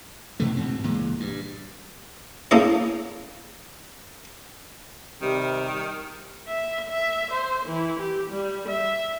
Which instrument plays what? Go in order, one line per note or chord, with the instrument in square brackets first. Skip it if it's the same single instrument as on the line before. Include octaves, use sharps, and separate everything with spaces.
[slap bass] A1 B2 E3 A3
D2 G#2 C4
C#2 A#2 E3 G#3
G2
[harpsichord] A#3 C#4 E4 G#4 A4 C5
[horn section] C3 G3 [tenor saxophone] D#3
[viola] E5
E5
C5
E3
G4
G3
E5